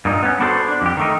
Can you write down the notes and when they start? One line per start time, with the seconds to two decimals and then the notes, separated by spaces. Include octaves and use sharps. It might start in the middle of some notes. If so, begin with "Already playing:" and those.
0.05 G2 A#2 D#4
0.23 B3 C#4
0.40 B3 D4 F#4 A4 B4 C5
0.68 D4
0.82 F2 G4
0.97 D#3 A3 D#4